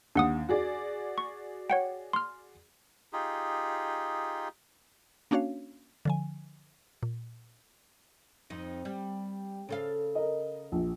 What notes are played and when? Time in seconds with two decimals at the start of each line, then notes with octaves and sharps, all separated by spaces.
0.15 D#2 D4 F#5 D#6
0.49 F#4 G#4 D5
1.18 C#6
1.70 C#5 F#5 G5
2.13 C6 F6
3.13 D#4 F4 G4 G#4
5.31 A#3 C#4 D4 F#4 C#5 F5
6.05 D3 F3 G#5
7.03 A#2
8.50 F2 D#4
8.85 G3
9.69 C#3 A4 F5
10.15 A#4 D#5
10.72 A#1